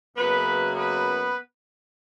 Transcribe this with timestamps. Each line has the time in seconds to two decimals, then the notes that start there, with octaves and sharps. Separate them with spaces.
0.17 F#2 C#3 F#3 A#3 B3 B4
0.75 B3 B4